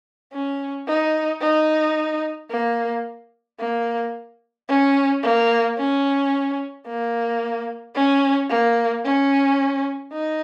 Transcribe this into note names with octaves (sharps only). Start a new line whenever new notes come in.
C#4
D#4
D#4
A#3
A#3
C#4
A#3
C#4
A#3
C#4
A#3
C#4
D#4